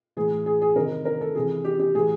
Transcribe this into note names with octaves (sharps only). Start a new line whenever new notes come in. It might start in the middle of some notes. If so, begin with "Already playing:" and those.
A2 E3 G#4
G#4
G#4
C3 D#3 A#4
A#4
A4
C3 E3 G#4
G4
G4
A2 E3 G#4